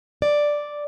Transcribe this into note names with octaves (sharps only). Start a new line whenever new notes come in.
D5